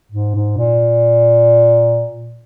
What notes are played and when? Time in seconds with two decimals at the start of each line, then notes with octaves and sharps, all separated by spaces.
0.12 G#2
0.35 G#2
0.58 A#2